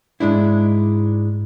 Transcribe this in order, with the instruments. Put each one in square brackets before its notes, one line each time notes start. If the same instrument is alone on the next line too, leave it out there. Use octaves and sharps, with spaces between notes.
[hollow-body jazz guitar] G#2 G#3 D4 E4